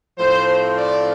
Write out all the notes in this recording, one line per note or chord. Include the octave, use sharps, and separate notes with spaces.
A2 F3 C4 C5
D5